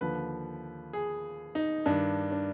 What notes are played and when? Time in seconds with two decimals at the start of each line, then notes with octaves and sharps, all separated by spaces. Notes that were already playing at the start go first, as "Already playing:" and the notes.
0.01 D#2 D3 F3 B4
0.93 G#4
1.55 D#4
1.86 G2 D#3 D4
2.32 D4